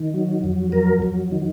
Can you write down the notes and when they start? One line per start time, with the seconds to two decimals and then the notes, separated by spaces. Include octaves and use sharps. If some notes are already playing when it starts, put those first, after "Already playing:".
Already playing: D#3
0.14 F#3
0.44 F2
0.72 F#3 A#4
1.02 F2
1.32 D#3